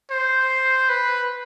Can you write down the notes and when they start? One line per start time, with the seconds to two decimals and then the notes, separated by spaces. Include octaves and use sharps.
0.11 C5
0.89 B4